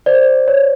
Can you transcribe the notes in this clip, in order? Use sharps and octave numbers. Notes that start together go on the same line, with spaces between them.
C5 D5
C#5